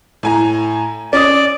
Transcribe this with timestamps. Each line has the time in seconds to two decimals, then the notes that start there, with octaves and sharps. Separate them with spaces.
0.23 A2 G#5 A#5
1.13 C#4 D5 D#6